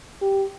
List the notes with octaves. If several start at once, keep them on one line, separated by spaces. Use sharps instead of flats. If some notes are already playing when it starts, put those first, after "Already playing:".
G4